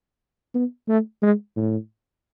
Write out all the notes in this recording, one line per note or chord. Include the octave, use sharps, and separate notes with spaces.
B3
A3
G#3
A2